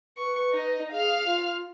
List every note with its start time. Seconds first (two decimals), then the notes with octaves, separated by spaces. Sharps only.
0.18 B4 C#6
0.52 D#4 D#5
0.92 G#4 F5 F6
1.25 F4